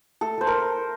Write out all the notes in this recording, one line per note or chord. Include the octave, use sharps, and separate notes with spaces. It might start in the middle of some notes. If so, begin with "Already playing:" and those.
A3 A4
A3 C5
A#4